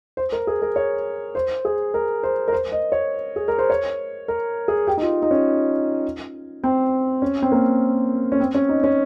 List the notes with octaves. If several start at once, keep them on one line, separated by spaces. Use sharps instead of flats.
C5
A#4
G#4
A#4
C#5
C5
G#4
A#4
C5
A#4
C5
D#5
C#5
G#4
A#4
C5
C#5
A#4
G#4
G4
D#4
F4
D#4
C#4
C4
C#4
C4
A#3
C#4
C4
C#4
D#4
C#4